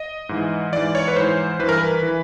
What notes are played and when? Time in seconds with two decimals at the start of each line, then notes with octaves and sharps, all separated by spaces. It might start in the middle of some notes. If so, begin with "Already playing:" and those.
Already playing: D#5
0.29 G#2 E3
0.72 G#2 E3 D5
0.95 C#5
1.08 B4
1.16 G#2 E3 C5
1.59 G2 E3 B4
1.69 A#4
1.78 B4
2.03 E3